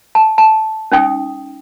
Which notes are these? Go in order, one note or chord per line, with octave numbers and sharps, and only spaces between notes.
A5
A5
C#4 D#4 G5 D#6